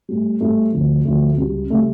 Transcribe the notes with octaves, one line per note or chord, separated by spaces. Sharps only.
A2 G3
A2 G3 A3
D2 D3 F3
D2 D3 F3 A3
C#2 C#3 G3
C#3 G3 A3